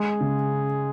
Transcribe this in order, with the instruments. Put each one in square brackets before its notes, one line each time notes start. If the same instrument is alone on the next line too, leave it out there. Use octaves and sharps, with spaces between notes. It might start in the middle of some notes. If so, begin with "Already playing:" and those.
Already playing: [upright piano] G#3 [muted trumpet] G#4
[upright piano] C#3